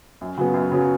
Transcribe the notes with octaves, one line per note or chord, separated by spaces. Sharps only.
F#2
C#3 F#3 B3
F#2
C#3 F#3 B3